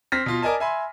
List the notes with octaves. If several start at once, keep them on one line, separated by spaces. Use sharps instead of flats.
C4 F6 A#6 B6
B2 F4
A#4 D5 D#5 G#5 A5
E5 G#5 B5 C6